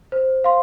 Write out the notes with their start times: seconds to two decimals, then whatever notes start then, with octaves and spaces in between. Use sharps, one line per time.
0.12 C5
0.44 F5 C6